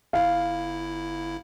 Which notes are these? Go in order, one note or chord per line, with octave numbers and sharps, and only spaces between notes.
G1 E4 F5